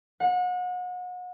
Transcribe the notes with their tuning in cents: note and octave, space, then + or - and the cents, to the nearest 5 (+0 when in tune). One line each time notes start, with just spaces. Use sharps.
F#5 -35